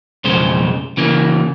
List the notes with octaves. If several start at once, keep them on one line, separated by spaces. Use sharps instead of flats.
B1 F2 C#3 G#3 C5
C#3 E3 A#3